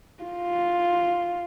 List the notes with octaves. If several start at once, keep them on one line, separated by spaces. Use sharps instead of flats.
F4